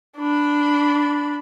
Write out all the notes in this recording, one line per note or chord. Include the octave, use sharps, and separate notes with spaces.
D4 B5